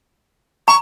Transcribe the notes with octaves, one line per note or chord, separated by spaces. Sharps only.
A#5 C#6